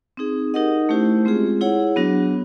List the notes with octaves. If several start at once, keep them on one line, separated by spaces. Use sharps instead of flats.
C4 D#4 G#4
D#4 G4 A#4 D#5 F#5
A3 C#4 E4 G4 C5
G#3 C4 F4 G#4
E4 G#4 C#5 F#5
F#3 B3 D4 F#4